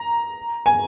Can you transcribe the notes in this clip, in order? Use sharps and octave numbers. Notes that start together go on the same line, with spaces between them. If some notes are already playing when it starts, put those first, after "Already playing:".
Already playing: A#5
G#5